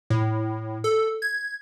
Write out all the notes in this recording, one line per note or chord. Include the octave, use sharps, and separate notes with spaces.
A2
A4
G#6